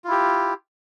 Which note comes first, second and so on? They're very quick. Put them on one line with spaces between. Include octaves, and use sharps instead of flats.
F4 E4 G4